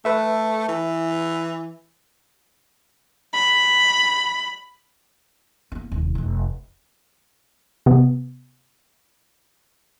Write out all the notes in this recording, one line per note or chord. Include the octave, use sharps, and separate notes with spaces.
A3 B4 E5
E3
B5
A#3 C4
D#1 C2
F1 F2
C3 B3